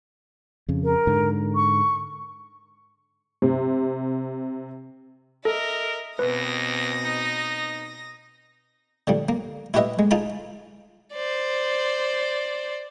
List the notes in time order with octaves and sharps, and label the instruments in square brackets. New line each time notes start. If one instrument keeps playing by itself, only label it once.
[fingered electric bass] F2 C#3
[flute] A#4
[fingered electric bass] G#2 D3
[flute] C#6
[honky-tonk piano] C3
[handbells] A4 [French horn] A#4 [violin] D#5 E5
[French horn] D#2 [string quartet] B2 C4 [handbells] B4 [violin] D#6 A#6
[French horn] D#4
[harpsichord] D3 F3 G3
A#3
E4 F#4 G4 B4 D#5 E5
G#3
D#4 F4 G#4 A5 B5
[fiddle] C5 D5